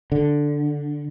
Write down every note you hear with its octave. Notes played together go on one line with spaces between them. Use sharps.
D3